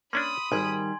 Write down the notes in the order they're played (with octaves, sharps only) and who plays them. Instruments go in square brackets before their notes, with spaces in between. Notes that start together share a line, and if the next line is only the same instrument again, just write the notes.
[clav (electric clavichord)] A#3 C#4 D4 [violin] B5 D#6 [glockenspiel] C6
[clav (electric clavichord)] G#1 [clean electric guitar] D#3 G3 [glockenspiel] G#5 C6 G#6